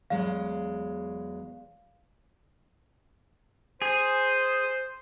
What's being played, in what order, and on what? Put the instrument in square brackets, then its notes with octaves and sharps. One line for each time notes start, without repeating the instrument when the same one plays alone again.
[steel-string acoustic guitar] E2 F#3 G#3 [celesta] F5
[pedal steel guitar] G#4 [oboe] C5